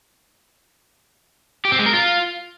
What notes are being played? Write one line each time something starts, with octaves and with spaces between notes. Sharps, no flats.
G4
C4
G#3
A#4
F4